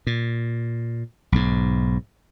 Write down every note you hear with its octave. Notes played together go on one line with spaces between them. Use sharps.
A#2
B1 G#2